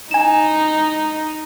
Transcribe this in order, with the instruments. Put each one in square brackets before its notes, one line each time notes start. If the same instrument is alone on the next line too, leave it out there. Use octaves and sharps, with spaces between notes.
[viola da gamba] D#4 [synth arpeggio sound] G#5 E7